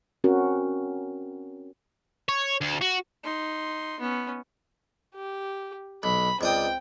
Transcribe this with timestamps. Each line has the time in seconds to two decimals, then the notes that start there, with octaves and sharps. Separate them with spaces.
0.24 C4 C#4 F#4 A#4
2.29 C#5
2.61 D2
2.81 F#4
3.24 D#4 C6
4.00 B3 C#4
5.14 G4
6.03 B1 B5
6.41 C#2 C4 D5 G5 D#6